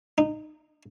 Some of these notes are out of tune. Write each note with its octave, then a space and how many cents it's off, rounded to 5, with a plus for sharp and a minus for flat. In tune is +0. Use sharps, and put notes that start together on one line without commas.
D#4 -20